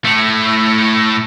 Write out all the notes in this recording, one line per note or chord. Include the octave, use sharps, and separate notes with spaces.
A2 A3